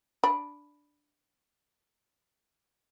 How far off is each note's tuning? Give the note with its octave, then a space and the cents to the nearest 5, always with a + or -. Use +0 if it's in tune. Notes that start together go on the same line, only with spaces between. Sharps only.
D4 +0 B5 +0